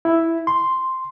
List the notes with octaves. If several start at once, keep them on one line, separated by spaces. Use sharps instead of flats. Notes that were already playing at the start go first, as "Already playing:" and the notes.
E4
C6